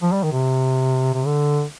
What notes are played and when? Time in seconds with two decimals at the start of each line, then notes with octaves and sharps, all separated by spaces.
0.03 F3
0.12 G3
0.23 D#3
0.32 C3
1.14 C3
1.26 D3